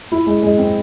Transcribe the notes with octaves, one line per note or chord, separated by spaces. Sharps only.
E4
G#3
G#3
C4